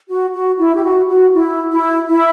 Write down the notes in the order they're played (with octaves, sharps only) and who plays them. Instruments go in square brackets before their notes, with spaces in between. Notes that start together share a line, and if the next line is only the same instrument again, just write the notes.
[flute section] F#4
F#4
E4
G4
F#4
F#4
E4
E4
E4